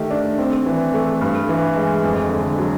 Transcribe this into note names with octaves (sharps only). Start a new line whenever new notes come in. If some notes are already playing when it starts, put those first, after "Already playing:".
Already playing: D#3 A3 G4
D4
C4
E3
A3
G2
E3
G#3
F2
D3
F#3